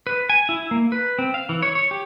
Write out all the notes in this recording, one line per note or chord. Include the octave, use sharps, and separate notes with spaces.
B4
G#5
E4
A#3
B4
C4
F5
E3
C#5
C#5
G4